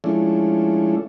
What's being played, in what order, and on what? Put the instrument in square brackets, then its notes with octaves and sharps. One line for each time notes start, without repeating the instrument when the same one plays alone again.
[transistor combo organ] F3 G#3 A3 C#4 D4 E4